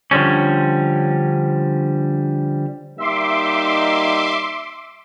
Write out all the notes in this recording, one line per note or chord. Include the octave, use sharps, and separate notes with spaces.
D3 F3 G3 C#4
G3 A#3 D#4 E5 C6 D6